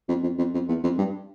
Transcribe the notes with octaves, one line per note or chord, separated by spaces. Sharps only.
F2
F2
F2
F2
E2
F2
G2